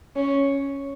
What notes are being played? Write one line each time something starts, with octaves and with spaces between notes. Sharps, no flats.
C#4